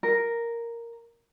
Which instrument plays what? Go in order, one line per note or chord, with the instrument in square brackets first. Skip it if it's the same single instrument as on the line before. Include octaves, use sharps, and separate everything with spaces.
[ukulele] A#4